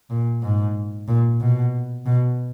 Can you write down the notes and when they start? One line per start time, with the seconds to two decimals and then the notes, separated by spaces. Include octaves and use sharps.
0.10 A#2
0.43 G#2
1.08 A#2
1.41 B2
2.06 B2